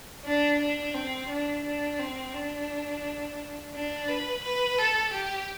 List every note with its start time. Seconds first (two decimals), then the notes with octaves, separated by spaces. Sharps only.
0.25 D4
0.60 D4
0.94 C4
1.29 D4
1.64 D4
1.99 C4
2.33 D4
3.74 D4
4.08 B4
4.44 B4
4.78 A4
5.13 G4